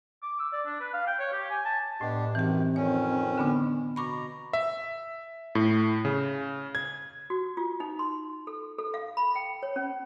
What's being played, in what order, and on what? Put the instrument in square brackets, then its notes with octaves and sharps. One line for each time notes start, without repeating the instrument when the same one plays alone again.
[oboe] D6
E6
D5
D4
B4
F5
G5
C#5
G4
G#5
A5
[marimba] A2 [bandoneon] B3 D4 G4 [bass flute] D#5
[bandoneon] F#2 D#3 [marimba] E3 G4 [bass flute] C4
[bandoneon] F2 D#3 C#4 [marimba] C#5
[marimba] D3 B3 D4
[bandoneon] B2 A#5 [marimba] B5 C#6 D6
[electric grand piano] E5
A2
C#3
G#6
[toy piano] F#4
F4
D#4
C6
A4
A4
F5
B5
G5
C#5
C#4